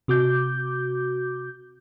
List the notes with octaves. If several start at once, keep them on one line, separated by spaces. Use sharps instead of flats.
C3 F#4 D6 G6